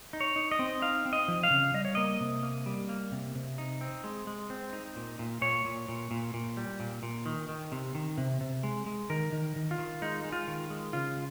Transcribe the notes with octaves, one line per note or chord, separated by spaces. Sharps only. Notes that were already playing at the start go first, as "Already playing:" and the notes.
D#4
C#5
D#4
D#5
C4
D#4 F5
C4
D#5
F3
F5
C#3
G3 D#5
C#5
A#3 D#5
C3
A#3
G3
A#3
C3
C3
D#4
C4
G#3
G#3
C4
D#4
A#2
A#2
A#2 C#5
A#2
A#2
A#2
A#2
G3
A#2
A#2
D#3
D#3
C3
D#3
C3
C3
G#3
G#3
D#3 A#4
D#3
D#3
F4
D#3
G#3 D#4
G#3
F4
D#3
G#3
C#3 F4